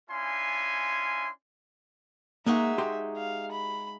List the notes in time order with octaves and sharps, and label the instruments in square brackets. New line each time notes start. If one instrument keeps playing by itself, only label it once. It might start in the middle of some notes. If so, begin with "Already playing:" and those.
[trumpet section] C#4 D4 E4 F4 G#5 C6
[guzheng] G#3 D#4 F#4 [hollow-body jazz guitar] A#3 [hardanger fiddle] E5
[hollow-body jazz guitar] G4 A#5 C6
[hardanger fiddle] F5
B5